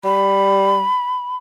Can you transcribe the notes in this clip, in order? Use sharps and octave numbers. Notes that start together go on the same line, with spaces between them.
G3 B5